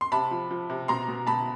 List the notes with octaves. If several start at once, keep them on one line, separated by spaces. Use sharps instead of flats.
C6
C3 A5 B5
F3
F3
C3
B2 A#5 C6
B2
B2 A5 B5